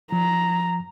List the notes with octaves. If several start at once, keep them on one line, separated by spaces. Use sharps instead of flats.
F3 A#5